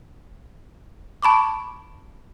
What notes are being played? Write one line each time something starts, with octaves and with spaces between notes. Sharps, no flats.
A5 B5 C#6 D6